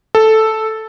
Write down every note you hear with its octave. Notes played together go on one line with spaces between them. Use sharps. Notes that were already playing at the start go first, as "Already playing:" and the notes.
A4